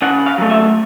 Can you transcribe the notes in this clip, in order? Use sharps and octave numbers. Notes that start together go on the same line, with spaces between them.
C#3 F#5
F5
F#3 A3
E5